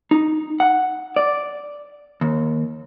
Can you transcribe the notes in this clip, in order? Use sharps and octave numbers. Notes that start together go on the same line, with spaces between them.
D#4
F#5
D5
D#2